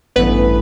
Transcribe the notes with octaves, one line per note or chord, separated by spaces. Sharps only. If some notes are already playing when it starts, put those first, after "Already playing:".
A1 G2 E3 A3 B3 B4